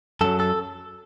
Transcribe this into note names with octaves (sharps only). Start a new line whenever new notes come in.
F#2 F#3 A4
A4